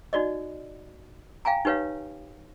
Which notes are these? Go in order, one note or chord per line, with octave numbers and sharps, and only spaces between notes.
D#4 F#4 D5 D#5
F5 G5 G#5 A#5
D#4 G4 B4 C#5 F5